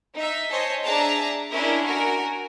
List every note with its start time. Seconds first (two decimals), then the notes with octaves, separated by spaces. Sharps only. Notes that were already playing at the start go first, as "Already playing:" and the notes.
0.15 D#4 E5
0.49 C5 C#5 D#5 G#5 A5
0.83 D4 G#4 E5 A5 A#5
1.50 C#4 D4 E4 A#4 D#5
1.85 F#4 A#4 G#5